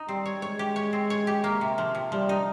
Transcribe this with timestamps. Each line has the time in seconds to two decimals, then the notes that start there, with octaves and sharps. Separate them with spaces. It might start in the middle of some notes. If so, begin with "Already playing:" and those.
Already playing: D#4
0.08 G3 C4
0.26 C#5
0.42 G#3 C#5
0.59 G4
0.76 C#5
0.93 C4
1.10 C#5
1.27 G4
1.44 A#3
1.61 C3
1.78 F3
1.95 C3
2.12 F3 G3
2.29 D#4